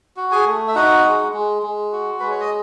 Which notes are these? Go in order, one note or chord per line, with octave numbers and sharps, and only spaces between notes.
F#4
G#4 G#5
A3
E5
D#4 F#4 F#5
G#3
G#3
G#3
F#4
G#3 B4
C#5
D#5